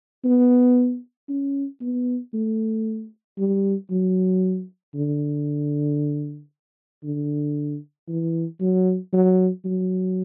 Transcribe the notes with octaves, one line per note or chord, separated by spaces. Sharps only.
B3
C#4
B3
A3
G3
F#3
D3
D3
E3
F#3
F#3
F#3